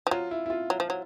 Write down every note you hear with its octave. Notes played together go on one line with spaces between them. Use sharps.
F3
F#3 F4
E4
E4
F4
F#3
F3
F#3